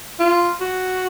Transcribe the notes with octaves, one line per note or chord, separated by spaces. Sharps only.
F4
F#4